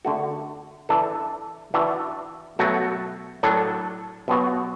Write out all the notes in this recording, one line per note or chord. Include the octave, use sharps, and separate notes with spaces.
D3 A3 F#4
E3 D4 A4
E3 D4 F#4
B2 F#3 A3 F#4
A2 F#3 D4 A4
B2 F#3 B3 F#4